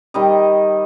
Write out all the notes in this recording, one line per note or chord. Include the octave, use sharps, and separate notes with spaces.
D#3 G3 D#5